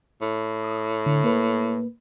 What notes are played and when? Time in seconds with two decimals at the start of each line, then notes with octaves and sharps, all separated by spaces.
0.22 A2
0.64 D#6
1.06 D3
1.24 A#3 B4